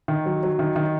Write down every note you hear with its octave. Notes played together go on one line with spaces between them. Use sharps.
D#3
F#3
F#3
D#3
D#3